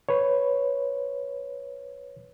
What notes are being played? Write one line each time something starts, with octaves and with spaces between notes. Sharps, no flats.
B4 C#5